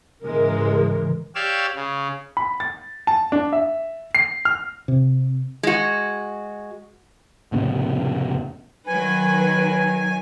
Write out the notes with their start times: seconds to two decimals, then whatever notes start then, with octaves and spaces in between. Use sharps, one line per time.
0.23 G#2 C#3 E3 G#3 A#4
1.35 G4 C#5 D5 F5 E6
1.75 C#3
2.37 B5
2.60 A6
3.07 A5
3.32 D4
3.53 E5
4.15 C7
4.45 F6
4.88 C3
5.63 G#3 F#4
7.52 F1 A2 C#3 B3
8.87 D#3 F#3 B4 G#5